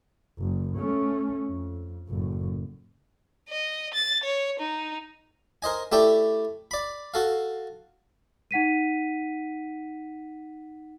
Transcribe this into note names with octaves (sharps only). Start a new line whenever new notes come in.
F#1
A3 C#4
F2
F#1 A2
D#5
A6
C#5
D#4
A#4 C5 D#5 G#5
A3 E4 G4 A4 D5 G5
D5 B5
F#4 A4 F5
D#4 F#5 B6 D#7